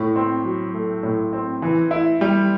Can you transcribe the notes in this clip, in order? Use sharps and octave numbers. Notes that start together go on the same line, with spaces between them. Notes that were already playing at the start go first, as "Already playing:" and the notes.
Already playing: A2
C4
F#3
A3
A2
C4
E3
E4
G3